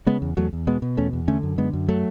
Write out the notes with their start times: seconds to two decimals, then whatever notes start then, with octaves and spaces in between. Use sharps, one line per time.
0.06 C#3 G#3 B3
0.22 E2
0.37 E2 F#3 A3
0.53 E2
0.67 B2 G#3 B3
0.82 B2
0.97 E2 A3 C#4
1.13 E2
1.28 D3 A3 C#4
1.43 F#2
1.58 D3 G#3 B3
1.73 F#2
1.88 F#3 A3